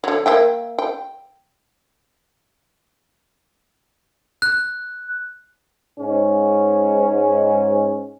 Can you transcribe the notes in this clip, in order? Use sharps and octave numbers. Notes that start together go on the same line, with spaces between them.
D3 F#3
A#3 E5 G5
G5
F#6
G#2 C#4